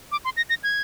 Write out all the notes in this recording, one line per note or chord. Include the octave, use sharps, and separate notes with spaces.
D6
C6
A#6
A#6
G#6